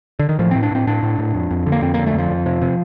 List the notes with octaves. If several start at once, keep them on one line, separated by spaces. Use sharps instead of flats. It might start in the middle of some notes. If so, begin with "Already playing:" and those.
D3
D#3
A2 F3
A2 C4
D4
A2 C4
A2 D4
A2
A2
F2
F2
D3
A#3
F2 C4
D3 A#3
A3
F2 F3
F2
C3
C3